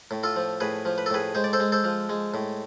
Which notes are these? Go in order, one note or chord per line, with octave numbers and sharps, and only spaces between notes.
A2
F4 A4
F3
A2 G#4 B4
F3
B4
A4
A2 G#4 B4
G#3 C5
D5
A4 C5
G#3
A4 C5
F3
G#3
A2